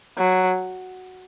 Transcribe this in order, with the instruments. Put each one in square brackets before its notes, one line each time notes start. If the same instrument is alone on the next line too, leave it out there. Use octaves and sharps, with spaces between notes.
[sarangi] F#3